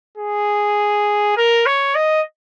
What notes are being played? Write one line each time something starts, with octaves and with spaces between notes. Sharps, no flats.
G#4
A#4
C#5
D#5